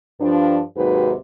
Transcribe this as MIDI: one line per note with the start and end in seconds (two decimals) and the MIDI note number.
0.21 0.61 43
0.21 0.61 53
0.21 0.61 62
0.76 1.13 39
0.76 1.13 44
0.76 1.13 48
0.76 1.13 54
0.76 1.13 66
0.76 1.13 71